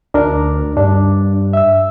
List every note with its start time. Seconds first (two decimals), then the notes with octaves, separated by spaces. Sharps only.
0.14 D2 D4 A#4
0.77 G2 D4
1.53 E5 E6